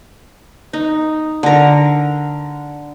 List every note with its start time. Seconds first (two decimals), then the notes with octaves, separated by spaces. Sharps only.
0.73 D#4
1.43 D3 A#4